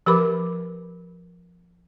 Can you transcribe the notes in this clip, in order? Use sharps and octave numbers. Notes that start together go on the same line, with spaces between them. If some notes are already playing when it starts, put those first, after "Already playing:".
F3 G4 A#4 B4 B5 D6